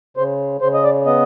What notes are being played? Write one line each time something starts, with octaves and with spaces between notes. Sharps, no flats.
C#3 C5
C#3 C5
D#5
D5
B3 D#5